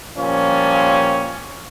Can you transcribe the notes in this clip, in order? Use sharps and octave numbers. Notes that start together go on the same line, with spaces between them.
A#2 F3 G3 C#4